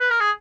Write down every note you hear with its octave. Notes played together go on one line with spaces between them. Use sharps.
B4
A#4
G#4